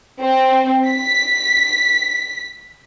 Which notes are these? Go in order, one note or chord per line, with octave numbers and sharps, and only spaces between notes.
C4
B6